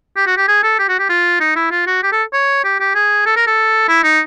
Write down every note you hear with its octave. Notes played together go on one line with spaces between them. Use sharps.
G4
F#4
G4
G#4
A4
G4
F#4
G4
F4
D#4
E4
F4
F#4
G4
A4
C#5
G4
G4
G#4
A4
A#4
A4
E4
D#4